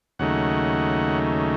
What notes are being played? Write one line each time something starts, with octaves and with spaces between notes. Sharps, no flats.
D#2 C#3 F#3 A3 D#4 F#5